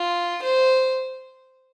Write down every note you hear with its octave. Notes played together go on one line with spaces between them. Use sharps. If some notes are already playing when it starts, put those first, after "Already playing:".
Already playing: F4
C5